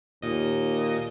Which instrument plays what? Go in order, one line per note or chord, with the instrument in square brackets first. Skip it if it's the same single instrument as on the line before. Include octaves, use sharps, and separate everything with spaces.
[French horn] D#2 [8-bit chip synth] A#2 D#5